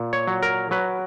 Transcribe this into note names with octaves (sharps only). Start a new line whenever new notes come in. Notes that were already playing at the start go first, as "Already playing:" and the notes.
Already playing: A#2
C#5
F#3
A#4
F#3 B4